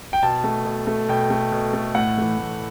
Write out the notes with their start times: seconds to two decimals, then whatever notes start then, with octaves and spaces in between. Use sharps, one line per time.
0.13 G5
0.23 B2 A5
0.44 A3
0.65 B2
0.87 A3
1.09 B2 G5
1.30 A3
1.52 B2
1.73 A3
1.95 A2 F#5
2.17 E3 A3
2.38 A2